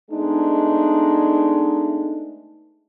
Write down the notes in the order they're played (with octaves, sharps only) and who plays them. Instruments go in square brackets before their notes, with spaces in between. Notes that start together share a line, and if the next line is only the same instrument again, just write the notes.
[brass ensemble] G#3 A3 B3 D4 D#4